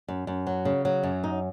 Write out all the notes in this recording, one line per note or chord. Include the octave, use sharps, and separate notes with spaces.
F#2
F#2
F#3
C#3
F#3
F#2
D#4